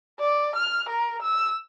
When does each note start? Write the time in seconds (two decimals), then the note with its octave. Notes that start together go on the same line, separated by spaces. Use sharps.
0.20 D5
0.56 F6
0.89 A#4
1.22 E6